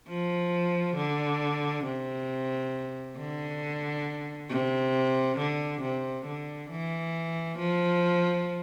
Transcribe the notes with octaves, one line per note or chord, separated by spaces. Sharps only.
F3
D3
C3
D3
C3
D3
C3
D3
E3
F3